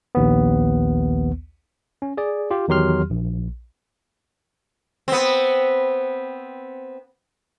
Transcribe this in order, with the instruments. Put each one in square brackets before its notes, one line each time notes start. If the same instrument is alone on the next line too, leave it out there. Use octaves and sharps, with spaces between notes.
[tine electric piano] A#1 D#2 B3
C#4
G#4 D5
F4 G4
E2 D#3 F#3 G4 C6 F6
A#1
[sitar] B3 C4